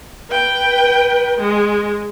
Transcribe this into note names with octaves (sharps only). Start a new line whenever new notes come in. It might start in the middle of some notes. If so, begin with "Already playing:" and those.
B4 G5
G#3